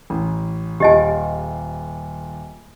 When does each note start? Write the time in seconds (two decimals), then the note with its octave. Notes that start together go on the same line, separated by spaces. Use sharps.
0.10 A1
0.80 D#1 F4 G4 D#5 G#5